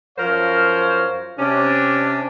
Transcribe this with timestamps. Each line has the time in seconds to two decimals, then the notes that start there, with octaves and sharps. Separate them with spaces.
0.19 F#2 F3 A#4 C5 C#5 F5
1.39 C3 C#4 D4